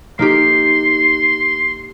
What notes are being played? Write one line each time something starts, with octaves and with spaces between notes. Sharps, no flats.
A#3 D#4 G4 C6